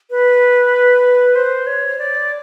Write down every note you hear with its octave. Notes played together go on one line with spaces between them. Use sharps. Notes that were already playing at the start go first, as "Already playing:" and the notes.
B4
C5
C#5
D5